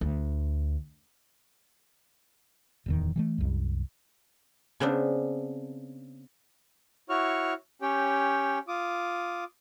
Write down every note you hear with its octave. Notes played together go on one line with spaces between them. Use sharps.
D2
D1 E2 D#3
E3 F3 A3
C2 F#2
C#3 B3 C4 D4
E4 F#4 C#5 C#6 F6
C#4 G4 C#5 G5
F4 D6 D#6